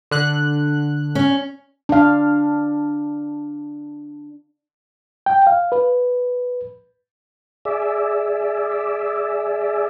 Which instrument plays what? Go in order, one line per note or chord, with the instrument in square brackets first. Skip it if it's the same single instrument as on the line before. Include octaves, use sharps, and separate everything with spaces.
[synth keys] D3 F#6
[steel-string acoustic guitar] C#4
[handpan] D4 F5
[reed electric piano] G5
F5
B4
[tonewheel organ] G#4 D5 E5